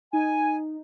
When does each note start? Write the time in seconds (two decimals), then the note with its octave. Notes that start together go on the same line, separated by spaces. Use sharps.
0.13 D#4 G#5